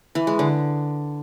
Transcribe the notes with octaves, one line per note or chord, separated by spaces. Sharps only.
E3
G#3
D3